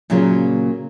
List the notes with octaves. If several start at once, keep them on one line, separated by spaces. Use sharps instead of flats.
A#2 C#3 F#3 A#3 F4